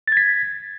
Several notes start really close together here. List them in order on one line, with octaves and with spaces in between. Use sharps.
A6 G#6 B6